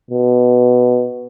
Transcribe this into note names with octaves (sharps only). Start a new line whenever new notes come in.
B2